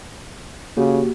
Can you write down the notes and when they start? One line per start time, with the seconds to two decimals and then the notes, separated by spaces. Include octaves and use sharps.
0.77 C#3 A#3 F#4 G4